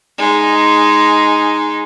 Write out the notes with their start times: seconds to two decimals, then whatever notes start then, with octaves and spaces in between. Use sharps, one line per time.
0.18 G#3 D#4